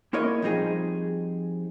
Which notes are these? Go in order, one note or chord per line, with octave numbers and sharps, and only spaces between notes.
A#3 E4 A#4 C#5 D#5
F3 G3 C4 D#4 G#4